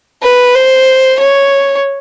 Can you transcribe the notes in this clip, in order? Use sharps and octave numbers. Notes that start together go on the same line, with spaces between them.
B4
C5
C#5